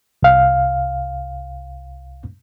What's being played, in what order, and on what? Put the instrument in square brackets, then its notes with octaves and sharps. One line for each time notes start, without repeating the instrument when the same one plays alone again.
[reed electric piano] C2 F5